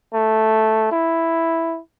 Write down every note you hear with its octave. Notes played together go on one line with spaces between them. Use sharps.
A3
E4